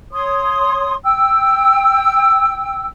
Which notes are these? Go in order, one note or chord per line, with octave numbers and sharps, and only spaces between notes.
C#5 C6 D#6
G5 E6